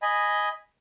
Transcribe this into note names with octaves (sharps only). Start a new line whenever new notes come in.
D#5 G#5 B5